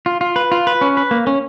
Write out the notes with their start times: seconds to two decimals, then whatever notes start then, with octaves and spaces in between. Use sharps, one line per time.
0.06 F4
0.21 F4
0.36 B4
0.52 F4
0.67 B4
0.81 C#4
0.97 B4
1.11 A#3
1.27 C#4